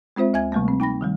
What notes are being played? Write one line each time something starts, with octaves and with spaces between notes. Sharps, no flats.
G#3 C4 F4 C5 E5
D2 E5 G#5 G#6
C3 F3 G3 A3 A#3
C4
D#4 G5 B5 A#6
D#3 F3 G3